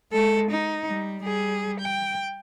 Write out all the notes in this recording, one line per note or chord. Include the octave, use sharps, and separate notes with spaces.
G#3 A4
D#4
G3
G3 G#4
G5